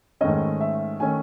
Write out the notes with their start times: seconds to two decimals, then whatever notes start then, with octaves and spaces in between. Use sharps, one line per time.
0.21 G#2 D#3 A3 C#4 D#5
0.61 E5
1.00 D#3 A3 C#4 G#5